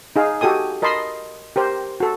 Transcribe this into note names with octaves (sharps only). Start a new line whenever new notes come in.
D#4 G#4 F5
F#4 G4 A4 G#5 D#6
A#4 D#5 A5 B5 C6
G4 A#4 C5
F#4 A4